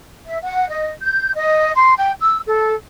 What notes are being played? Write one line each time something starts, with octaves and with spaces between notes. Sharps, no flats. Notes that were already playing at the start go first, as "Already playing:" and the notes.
E5
F#5
D#5
G6
D#5
C6
G5
E6
A4